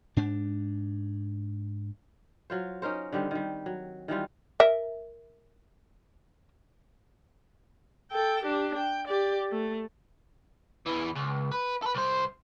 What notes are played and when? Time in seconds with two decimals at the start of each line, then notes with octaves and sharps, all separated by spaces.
0.17 G#2 D4
2.50 F#3 F4 C5
2.82 C#4 D#4 A#4 C5
3.12 D3 D#3 G3 C4
3.31 D#3 G3
3.66 F#3
4.08 D#3 E3 G3 F4
4.60 A#4 E5
8.12 A4 G5
8.44 D4 G4
8.77 G5
9.08 G4 D5
9.51 A3
10.87 E2 E3
11.16 C#2
11.52 B4
11.82 A4 B4
11.95 C2 C5